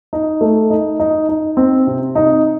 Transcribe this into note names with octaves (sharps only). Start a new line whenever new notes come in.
D#4
A3
D#4
D#4
D#4
C4
C3
D#4